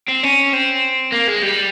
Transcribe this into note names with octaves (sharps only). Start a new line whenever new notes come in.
C4
C#4
C4
A#3
G#3
G3